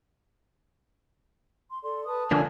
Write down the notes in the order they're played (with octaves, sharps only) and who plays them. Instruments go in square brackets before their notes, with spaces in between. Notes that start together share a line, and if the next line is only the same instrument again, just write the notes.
[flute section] C6
A4 D5 C6
[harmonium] B4 [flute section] A5 D#6
[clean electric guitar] D3 F3 A#3 [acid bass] D4 [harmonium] A4 G#5